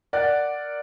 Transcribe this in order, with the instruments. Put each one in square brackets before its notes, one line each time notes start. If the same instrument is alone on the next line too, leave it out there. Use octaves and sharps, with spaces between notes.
[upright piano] A#4 D5 F#5 F#6 A6